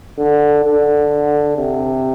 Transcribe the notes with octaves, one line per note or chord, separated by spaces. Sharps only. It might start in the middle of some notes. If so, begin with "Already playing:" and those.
D3
D3
C3